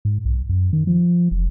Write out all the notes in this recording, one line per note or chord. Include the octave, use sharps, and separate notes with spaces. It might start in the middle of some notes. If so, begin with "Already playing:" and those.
G#2
B1
F#2
D#3
F3
F1